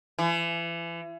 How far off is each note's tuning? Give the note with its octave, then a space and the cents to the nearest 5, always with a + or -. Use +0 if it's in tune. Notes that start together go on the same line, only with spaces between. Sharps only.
E3 +35